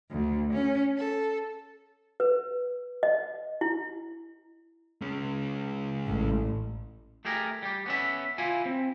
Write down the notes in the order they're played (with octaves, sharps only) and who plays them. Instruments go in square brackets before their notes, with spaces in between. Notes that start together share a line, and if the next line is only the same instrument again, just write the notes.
[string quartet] D2
C#4
A4
[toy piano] B4
D#5
E4
[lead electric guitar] G#3 C#4
[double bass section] A1
[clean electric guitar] A3 G4 G#4 A#4
G3 G4
B3 C#4 E5
E4 F4 G#5
C4